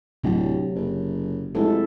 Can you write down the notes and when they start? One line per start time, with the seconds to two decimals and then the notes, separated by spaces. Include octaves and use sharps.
0.24 D1 C3 F#3
0.75 F#1
1.55 F1 G#3 E4 A4